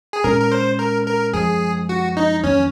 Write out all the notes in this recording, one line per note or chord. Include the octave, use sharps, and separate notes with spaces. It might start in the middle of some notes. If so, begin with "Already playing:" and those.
G#4
A#2 G#3 C#4 A#4
A#4
C5
A#4
A#4
F#2 F3 G#3 G#4
F#4
D#4
F2 D#3 F#3 A#3 C#4